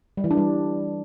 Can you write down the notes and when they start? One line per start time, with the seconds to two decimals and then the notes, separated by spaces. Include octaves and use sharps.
0.17 G3
0.24 E3
0.31 D4
0.37 G3